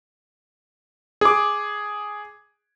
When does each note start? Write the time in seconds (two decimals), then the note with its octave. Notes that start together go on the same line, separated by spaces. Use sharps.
1.21 G#4 D6